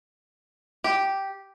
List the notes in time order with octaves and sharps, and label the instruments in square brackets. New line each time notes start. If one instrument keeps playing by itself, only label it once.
[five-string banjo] G4